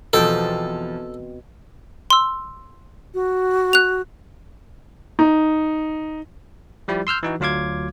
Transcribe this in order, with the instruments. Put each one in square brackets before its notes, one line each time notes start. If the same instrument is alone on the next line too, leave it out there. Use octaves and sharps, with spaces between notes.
[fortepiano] E2 F3 [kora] B2 C4 G5 [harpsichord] A4
[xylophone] C6 E6
[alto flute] F#4
[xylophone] F#6 F7
[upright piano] D#4
[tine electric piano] F3 G3 E4 G4 D5
C6 E6 F6 G6
E3 D#4 F#4
D2 F#3 F4 F5 D6 G#6